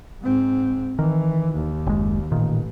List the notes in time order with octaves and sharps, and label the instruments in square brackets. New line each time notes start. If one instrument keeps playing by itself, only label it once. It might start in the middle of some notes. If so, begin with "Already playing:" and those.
[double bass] G#2 C4
[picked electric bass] D#3 [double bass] E3
[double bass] D#2
[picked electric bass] F#1 G#3
[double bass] A1 [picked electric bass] A#2 D#3